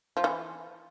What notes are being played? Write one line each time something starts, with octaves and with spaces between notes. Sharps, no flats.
F3
E3